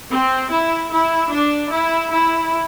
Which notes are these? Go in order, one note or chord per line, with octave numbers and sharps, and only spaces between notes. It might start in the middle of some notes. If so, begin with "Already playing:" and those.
C4
E4
E4
D4
E4
E4